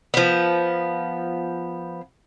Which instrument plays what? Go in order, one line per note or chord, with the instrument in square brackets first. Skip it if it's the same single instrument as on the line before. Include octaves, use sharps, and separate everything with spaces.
[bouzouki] F3 B3